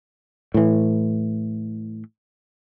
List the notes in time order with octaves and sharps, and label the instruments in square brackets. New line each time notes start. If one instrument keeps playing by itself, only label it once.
[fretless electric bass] A2 E3